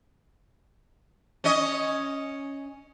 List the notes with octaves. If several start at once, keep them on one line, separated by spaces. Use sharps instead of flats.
C#4 D#5